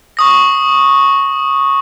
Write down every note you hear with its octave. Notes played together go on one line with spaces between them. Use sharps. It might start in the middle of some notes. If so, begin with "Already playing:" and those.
C#6 D#6 A#6